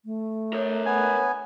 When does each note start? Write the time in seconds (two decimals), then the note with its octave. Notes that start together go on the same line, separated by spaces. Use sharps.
0.05 A3
0.53 A#4 C#5
0.86 B3 G#5